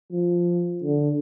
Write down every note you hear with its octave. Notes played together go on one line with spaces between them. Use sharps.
F3
D3